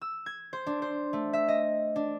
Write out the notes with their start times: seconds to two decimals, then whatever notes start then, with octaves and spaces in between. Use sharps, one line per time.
0.02 E6
0.26 G#6
0.53 C5
0.67 D4
0.82 C5
1.13 A3
1.33 E5
1.48 D#5
1.96 D4